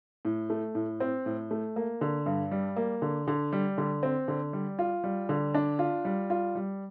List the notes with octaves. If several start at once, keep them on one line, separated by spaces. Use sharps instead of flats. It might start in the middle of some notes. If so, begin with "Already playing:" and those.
A2
A3
A2
C4
A2
A3
A#3
D3
G2
G3
A#3
D3
D3
G3
D3
C4
D3
G3
F4
G3
D3
D4
F4
G3
F4
G3